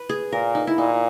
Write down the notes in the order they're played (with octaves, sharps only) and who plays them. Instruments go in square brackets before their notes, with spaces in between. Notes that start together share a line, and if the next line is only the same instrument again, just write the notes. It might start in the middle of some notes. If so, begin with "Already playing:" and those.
Already playing: [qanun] B4
G#4
[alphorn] A#2 [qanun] A#4
[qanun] D#4
E4
[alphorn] A#2 [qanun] D#4